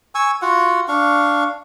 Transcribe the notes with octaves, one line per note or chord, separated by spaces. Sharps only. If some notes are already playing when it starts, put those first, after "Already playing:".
G#5 C#6 E6
F4 F#4 F#5
D4 F5 C#6